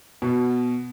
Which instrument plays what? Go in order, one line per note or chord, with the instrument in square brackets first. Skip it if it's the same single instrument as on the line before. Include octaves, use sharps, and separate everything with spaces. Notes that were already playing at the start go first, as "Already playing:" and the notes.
[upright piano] B2